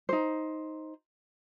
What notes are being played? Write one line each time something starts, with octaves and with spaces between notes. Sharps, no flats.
D#4 C5